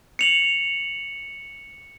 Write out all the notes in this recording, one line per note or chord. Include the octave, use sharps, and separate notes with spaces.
C#7 F7 F#7